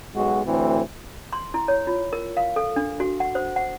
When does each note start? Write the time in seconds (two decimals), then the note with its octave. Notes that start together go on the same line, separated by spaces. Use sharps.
0.14 B1 G#3 F#4
0.46 D2 A2 E3 C4
1.33 C6
1.54 E4
1.68 C#5
1.87 F4
2.13 A#4
2.37 F5
2.56 A4
2.76 D4
3.00 F#4
3.20 F#5
3.35 C5
3.56 F#5